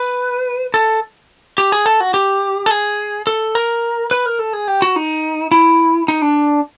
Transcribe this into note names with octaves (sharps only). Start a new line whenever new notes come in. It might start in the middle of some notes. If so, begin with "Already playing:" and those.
Already playing: B4
A4
G4
G#4
A4
F#4
G4
A4
G#4
A4
A#4
B4
A#4
A4
G#4
G4
F#4
D#4
E4
D#4
D4